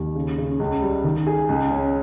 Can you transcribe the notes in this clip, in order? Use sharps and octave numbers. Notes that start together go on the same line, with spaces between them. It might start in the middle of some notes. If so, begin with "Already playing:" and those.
Already playing: D#2
C#3
C#3
C#2
G3
D#3
G#4
C#2
C#4